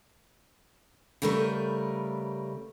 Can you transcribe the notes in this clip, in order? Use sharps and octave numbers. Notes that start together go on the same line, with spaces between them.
C#3 G3 A3 A#4 B4